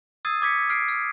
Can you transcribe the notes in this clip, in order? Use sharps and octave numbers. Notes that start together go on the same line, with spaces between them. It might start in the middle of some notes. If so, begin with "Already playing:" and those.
D#6 E6 G#6 A6 C7 D#7
D6 G#6 B6 C#7
F6 C7 D7
F6